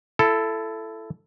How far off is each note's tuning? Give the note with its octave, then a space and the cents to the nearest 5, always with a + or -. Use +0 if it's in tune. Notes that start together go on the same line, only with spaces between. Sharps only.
E4 +25 A4 +0